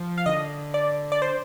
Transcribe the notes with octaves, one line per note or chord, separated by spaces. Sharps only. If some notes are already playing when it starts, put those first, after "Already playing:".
Already playing: F3
F5
D3 D#5
D5
D5
C5